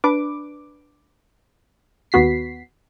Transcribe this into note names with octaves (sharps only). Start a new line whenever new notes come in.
D4 B4 D6
D#2 B3 F#4 B6 C7